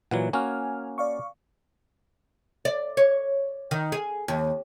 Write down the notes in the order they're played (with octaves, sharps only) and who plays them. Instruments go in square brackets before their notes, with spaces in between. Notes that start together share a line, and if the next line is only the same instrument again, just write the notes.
[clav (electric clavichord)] A#2 E3 F#3 [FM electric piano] F#5
[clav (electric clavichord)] A#3 C#4 F#4 [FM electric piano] G#5 F6
[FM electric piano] D5 F5 C#6
[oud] D5
C#5
D#3
G#4
D#2